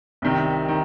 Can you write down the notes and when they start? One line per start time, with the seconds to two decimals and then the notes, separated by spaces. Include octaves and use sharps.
0.22 C2 C3 D#3
0.68 D#3